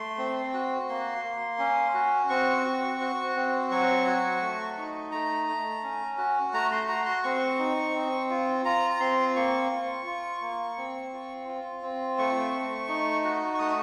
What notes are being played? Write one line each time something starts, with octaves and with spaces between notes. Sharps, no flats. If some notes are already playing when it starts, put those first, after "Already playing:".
Already playing: A3 C6
C4
F#4
A#3 C6
A#3
C#4
F#4
C4 C#6
F#4
F#4
C4
F#3 C#6
F#4
A3
D#4
A3 A#5
A3
C#4
F#4
A3 A#5
C6
F#4 A#5
C6
C4 C#6
D#4
C4
F4
F4 A#5
A#5
C4 C6
A#3 C#6
F4
F4
A#3
C4
F4
F4
C4
A3 C#6
A3
D#4
F#4
C#6
A3 D#6